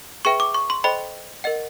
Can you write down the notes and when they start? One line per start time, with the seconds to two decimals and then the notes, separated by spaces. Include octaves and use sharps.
0.25 G#4 B4 E5 G5 C#6
0.40 D6
0.54 C#6
0.70 C6
0.84 A4 C5 D#5 G5 B5
1.44 A#4 D#5 F#5